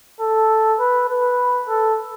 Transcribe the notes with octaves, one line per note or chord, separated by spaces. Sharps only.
A4
B4
B4
A4